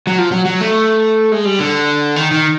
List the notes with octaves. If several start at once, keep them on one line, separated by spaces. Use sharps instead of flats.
F#3
F3
F#3
F#3
A3
G#3
G3
D3
D#3
D#3